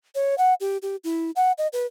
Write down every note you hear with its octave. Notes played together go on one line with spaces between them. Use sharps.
C#5
F#5
G4
G4
E4
F#5
D#5
B4